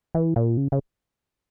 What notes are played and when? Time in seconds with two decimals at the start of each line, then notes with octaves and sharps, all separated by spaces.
0.15 E3
0.36 A#2
0.57 C#3
0.72 C#3